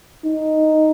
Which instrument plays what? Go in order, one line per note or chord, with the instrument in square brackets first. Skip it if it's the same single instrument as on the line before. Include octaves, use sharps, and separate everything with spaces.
[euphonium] D#4